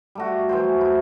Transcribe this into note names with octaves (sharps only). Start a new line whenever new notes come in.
G3 A3 F#4
E3 F#3 C5
E4